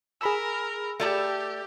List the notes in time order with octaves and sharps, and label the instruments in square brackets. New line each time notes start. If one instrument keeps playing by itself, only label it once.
[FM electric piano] G#4 B5 E6 [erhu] A#4
[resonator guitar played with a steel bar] A3 D5 A5 [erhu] G4